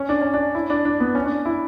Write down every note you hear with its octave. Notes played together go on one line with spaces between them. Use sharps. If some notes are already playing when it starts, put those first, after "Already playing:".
Already playing: C#4
D4
C#4
D4
E4
D4
D4
B3
C#4
D4
E4